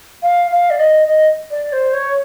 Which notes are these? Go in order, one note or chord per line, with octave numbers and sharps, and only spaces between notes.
F5
F5
D5
D#5
D#5
D5
C5
C#5